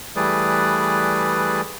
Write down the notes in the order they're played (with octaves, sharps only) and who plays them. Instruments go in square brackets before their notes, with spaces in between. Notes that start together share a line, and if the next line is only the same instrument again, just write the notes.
[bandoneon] E3 G3 A3 G#4 B4 D5